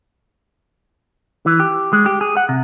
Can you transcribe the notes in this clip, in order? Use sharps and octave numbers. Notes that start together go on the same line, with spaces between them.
E3
G4
G#3
G4
G#4
F#5
C3